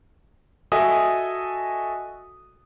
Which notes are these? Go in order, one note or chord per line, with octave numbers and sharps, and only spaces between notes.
F#4 A4 D#5 E5 G#5 D#6